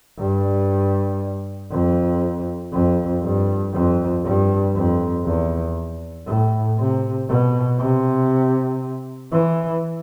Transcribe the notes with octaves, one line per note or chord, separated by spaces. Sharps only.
G2
F2
F2
G2
F2
G2
F2
E2
A2
C3
B2
C3
E3